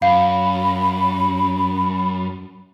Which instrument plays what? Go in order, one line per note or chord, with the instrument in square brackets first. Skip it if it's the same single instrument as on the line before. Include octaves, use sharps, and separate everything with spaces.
[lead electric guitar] F#2 [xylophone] F5 [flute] B5